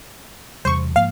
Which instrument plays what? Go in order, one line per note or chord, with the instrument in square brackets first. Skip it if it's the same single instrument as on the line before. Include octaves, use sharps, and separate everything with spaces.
[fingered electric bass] E2 C3 G3 [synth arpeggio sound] C5 C#6
[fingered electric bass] G#2 F3 A#3 [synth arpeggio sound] F5